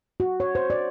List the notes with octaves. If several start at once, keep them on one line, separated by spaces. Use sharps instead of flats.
F#4
C#5
C5
D5